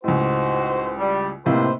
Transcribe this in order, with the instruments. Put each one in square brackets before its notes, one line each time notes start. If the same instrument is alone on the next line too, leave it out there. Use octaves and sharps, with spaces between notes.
[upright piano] C#2 A2 [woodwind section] D#4 F#4 C5
[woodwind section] G3
[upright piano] A2 C3 A#3 [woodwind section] D#4 B4 C5